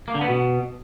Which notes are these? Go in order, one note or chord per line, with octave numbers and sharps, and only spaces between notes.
A#3
D3
B3
B2